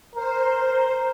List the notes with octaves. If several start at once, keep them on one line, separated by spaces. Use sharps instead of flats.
A#4 C5